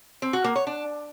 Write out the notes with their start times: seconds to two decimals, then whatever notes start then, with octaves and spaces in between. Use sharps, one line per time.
0.22 C4
0.33 F#4
0.44 A#3
0.56 C#5
0.67 D4